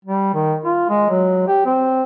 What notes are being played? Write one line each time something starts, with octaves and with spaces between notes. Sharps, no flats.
G3
D#3
F4
G#3
F#3
G4
C4